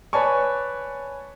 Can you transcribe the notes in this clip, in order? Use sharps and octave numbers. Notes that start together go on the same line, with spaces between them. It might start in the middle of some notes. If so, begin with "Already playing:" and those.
B4 C#5 D5 G#5 A5 C#6